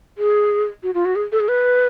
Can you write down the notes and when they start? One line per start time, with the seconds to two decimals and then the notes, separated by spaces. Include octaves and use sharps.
0.18 G#4
0.83 F#4
0.94 F4
1.05 F#4
1.16 G#4
1.32 A4
1.40 G#4
1.48 B4